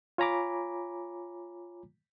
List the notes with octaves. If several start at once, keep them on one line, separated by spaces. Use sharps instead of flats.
F4 C#5 G#5 A#5 B5 D6